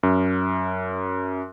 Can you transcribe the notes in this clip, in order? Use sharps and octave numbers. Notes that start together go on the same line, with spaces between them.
F#2